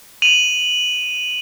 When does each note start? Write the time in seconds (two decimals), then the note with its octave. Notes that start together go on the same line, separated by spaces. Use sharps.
0.22 D#7 F7 F#7